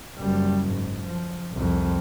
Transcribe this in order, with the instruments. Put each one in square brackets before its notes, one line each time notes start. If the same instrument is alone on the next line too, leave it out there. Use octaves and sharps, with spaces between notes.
[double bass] F#1 G3
G#2
F3
C2 F2